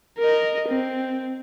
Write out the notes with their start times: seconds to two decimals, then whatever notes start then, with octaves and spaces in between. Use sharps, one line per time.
0.19 A#4 D#5
0.69 C4